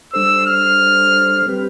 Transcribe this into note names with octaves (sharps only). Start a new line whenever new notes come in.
G3 D4 A4 C5 E6
F6
G3 C4 G4 B4